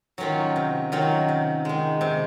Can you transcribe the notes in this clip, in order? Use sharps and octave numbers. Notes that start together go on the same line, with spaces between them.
D#3 F#3 C#4 F4
C3
D#3 F#3 C#4 F4
C3
D#3 G#3
C3